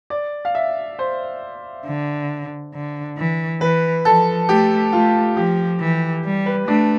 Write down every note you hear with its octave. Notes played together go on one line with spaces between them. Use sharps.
D5
F5
E5
C5
D3
D3
E3
E3 B4
F3 A4
A3 G4
A3 F4
F3 G4
E3
G3
B4
A3 D4